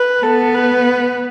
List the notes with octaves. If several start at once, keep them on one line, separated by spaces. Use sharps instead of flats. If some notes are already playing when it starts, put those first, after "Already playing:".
Already playing: B4
B3 A4
B4